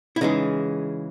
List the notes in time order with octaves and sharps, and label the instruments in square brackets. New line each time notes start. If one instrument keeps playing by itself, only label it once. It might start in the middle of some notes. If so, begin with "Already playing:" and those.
[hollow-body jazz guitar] E4
C#3 E3 G#3 D#4